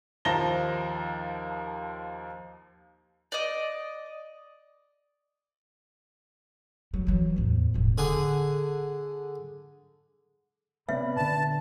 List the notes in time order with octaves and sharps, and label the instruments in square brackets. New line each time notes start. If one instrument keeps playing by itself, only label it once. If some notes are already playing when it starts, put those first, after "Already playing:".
[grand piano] D#2 F3 A5 A#5 A#6 G7
[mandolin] D5 D#5
[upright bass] F#3
E3 F#3
A1 E2
E1 A2
[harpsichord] D3 G#4
[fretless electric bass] C3 B3 C#4 [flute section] B4 D5 B5 [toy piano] E5
[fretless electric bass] A#2 D3 [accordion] A5